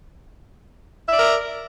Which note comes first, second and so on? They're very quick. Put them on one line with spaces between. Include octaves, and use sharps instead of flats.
E5 D5 A#4